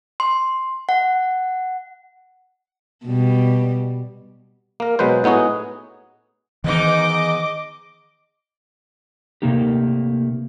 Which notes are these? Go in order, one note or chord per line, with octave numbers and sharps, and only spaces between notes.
C6
F#5
B2 G3
A#3 A#4
B2 F#3 G#3 B4 C5
A2 B3 D#4 F#4 G#4
G#2 D#3 E3 B3 D#4 D#5 D6
C3 F3 A3 A#3 D#4 G4